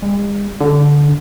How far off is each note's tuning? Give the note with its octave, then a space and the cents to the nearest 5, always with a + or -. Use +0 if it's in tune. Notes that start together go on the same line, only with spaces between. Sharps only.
G#3 -45
D3 -15